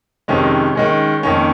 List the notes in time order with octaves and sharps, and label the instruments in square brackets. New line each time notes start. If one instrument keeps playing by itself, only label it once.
[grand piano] F2 C3 D#3 G#3 C#4
D#3 G#3 C#4
F2 D#3 A#3 C#4